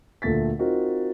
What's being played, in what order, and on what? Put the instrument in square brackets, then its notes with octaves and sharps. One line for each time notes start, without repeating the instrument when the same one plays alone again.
[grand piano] D2 A#2 A3 A6 B6
C4 D#4 F4 F#4 A#4